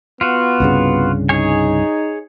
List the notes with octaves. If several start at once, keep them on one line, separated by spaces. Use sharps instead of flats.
B3 F4 F#4
C2 G2 C#3
D#4 G#4 C#5 G#5